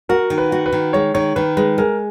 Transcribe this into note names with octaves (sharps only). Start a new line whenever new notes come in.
F#4 A#4
D#3
B4
F#4
B4
D#3
G#3 C#5
D#3 C#5
D#3 B4
G#3 B4
G#3 A#4